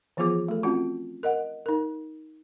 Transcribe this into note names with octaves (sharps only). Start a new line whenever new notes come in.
E3 F3 B3 F4 G#4 D6
A3 A4
C4 C#4 F4 F#4
A#4 D#5 F#5
D#4 A#4